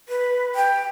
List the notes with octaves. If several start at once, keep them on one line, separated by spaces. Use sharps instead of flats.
B4
G5